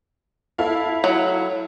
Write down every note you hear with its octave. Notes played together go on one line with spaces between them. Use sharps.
E4 A4 F5
F#3